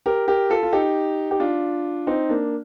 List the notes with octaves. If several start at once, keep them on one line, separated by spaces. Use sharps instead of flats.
G4 A#4
G4 A#4
F4 A4
F4
D#4 G4
G4
D4 F4
C4 D#4
A#3 D4